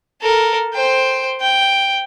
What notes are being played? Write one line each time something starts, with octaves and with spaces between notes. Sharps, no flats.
A4 A#4
C5 G5
G5